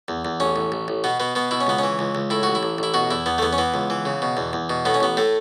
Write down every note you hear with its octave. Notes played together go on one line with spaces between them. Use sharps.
E2
E2
A1 C#4
A1
A1
A1
B2 B3
B2 B3
B2 B3
B2 E4
C#4
C#2 B3
E3 C#4
C#2
C#2
A2 E4
A1 F#4
E4
A1
A1 E4
B2 F#4
E2 E4
E2 B3
A3
E2 B3
C#4
E3 B3
C#2
E3
C#3
B2
E2
E2
B2
A2 B3
C#4
A1 B3
A2 A3